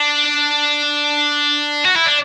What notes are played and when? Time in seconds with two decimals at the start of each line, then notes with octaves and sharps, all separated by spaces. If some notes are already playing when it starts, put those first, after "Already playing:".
Already playing: D4
1.85 F#4
1.96 E4
2.06 D4